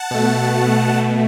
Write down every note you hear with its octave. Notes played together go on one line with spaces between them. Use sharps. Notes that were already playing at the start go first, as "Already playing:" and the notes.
Already playing: F#5 A5
B2 A3
B2 A3